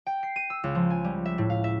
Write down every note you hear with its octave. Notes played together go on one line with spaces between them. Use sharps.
G5
C7
D#7
E6
C#2
F3
G#5
G3
E5
A2
F5
E5